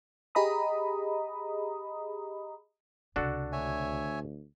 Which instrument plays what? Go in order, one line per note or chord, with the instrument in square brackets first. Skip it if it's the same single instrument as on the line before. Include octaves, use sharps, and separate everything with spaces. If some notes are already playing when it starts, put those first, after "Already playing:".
[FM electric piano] G4 G#4 D#5 A#5 B5 D#6
[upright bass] C#2 C3 [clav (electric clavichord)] D4 F#4 A4
[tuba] D2 [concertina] C#5 E5 G#5